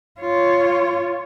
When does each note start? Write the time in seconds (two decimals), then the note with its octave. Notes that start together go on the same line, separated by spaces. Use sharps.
0.21 F4 C#5